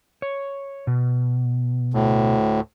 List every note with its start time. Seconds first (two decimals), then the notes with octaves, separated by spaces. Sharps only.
0.22 C#5
0.87 B2
1.94 D2 A2